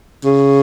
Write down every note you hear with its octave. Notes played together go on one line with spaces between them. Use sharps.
C#3